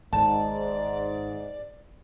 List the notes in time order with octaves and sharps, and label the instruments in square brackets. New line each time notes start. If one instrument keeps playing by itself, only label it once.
[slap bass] G#1 [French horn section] G#2 [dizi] D5 [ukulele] A5